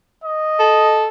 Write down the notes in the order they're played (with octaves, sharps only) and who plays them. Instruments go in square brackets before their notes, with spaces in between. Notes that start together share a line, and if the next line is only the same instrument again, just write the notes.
[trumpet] D#5
[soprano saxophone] A4